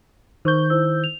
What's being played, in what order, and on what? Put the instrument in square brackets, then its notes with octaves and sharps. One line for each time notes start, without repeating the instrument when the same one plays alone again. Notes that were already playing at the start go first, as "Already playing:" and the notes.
[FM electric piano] D#3 G6 [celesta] C5 C#6
[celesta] E4 C5 E6
F7